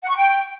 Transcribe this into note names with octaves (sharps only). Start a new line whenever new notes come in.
F#5
C#6
G5